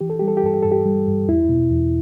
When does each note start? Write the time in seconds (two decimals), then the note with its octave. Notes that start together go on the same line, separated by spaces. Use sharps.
0.01 E3 G4
0.10 A4
0.19 G3 G4
0.28 A4
0.37 G4
0.44 G2 A4
0.54 G4
0.63 G2 A4
0.72 G4
0.86 G3
1.08 G2
1.28 E2 E4
1.49 B2
1.71 E2